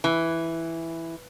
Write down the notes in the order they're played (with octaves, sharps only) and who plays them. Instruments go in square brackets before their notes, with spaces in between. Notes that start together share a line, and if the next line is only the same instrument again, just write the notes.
[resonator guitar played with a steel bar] E3